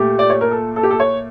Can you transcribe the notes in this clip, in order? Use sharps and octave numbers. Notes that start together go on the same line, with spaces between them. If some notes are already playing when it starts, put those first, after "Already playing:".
Already playing: A#2 A3 G4
D5
C#5
A#4
A4
A4
G4
A4
C#5